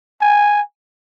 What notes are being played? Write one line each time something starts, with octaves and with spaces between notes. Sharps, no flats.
G#5